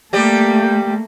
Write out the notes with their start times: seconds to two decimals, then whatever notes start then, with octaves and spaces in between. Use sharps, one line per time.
0.13 G3 A3 A#3 G4 D5